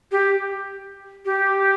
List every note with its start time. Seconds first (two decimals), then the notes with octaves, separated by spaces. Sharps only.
0.12 G4
1.25 G4